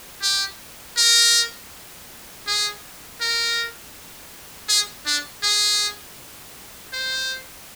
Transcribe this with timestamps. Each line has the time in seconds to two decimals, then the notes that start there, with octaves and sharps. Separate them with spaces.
0.22 G4
0.97 A#4
2.47 G#4
3.21 A#4
4.69 G#4
5.06 D4
5.43 G#4
6.93 C5